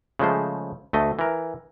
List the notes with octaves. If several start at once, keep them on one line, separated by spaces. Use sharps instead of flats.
C#3 F3 G#3 A3 C5
D2 A3 D#5
E3 A#4